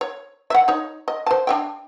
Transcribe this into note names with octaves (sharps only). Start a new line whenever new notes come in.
C#5
E5 F#5
D#4 C#5
D#5
C5 A5
D4 E5 G5